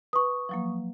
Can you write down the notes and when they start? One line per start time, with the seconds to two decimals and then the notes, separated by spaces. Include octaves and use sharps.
0.13 B4 C#6 D#6
0.49 F3 F#3 A#3